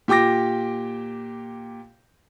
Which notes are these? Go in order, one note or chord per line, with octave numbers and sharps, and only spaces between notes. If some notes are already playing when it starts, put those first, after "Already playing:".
A#2 G4 G5 D6 A#6